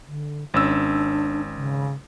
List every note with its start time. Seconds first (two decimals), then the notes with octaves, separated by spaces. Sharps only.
0.08 D3
0.54 G#1 C#4 D4 E6
1.55 C#3